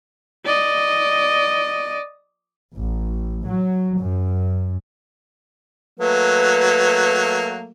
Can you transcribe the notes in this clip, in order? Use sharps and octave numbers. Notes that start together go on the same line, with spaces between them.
D5 D#5
A1
F#3
F#2
F#3 A3 A#3 B4